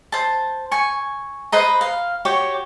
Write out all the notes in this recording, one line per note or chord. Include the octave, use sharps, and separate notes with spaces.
C5 A5
G#5 C#6
B4 C5 D#5 A#5
F5
F#4 G4 C#5